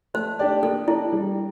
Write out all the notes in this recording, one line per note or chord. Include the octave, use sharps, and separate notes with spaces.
A3 C5
D4 G4 D5
A#3 A4
D4 E4 A4 D5
G3